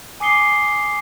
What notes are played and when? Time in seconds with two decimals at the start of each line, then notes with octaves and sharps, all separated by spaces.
0.20 G#5 D6 D#6 C7 C#7 G7